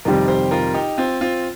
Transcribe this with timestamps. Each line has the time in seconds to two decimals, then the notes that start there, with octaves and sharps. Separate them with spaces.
0.05 F2 C3 D#3 G3 C4 F4 A#4
0.28 G4 C5
0.51 F4 A#4
0.74 D#4 G4
0.98 C4 F4
1.21 C4 F4